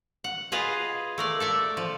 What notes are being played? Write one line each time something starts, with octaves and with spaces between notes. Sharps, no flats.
F#5
F4 G#4 B4 D#5 F5
A3 A#4 D5
A4 D5 E5
F3